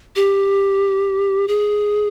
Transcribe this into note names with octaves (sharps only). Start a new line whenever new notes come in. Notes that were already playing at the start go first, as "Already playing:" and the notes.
G4
G#4